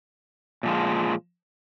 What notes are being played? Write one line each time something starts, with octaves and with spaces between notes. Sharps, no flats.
A#2 F3 G#3